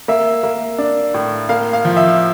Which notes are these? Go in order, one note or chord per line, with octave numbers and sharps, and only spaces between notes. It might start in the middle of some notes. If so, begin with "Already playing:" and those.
A#3 E5
A#3
D4
A2
A#3 F5
F5
F3
E5